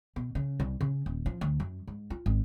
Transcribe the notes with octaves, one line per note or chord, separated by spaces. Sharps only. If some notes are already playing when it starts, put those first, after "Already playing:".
B2
C#3
C2
C#3
D#1
F3
D2
F#2
G#2
F4
G#1